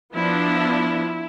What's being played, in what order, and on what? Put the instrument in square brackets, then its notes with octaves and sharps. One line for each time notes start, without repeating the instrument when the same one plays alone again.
[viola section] F3 B3 D4 E4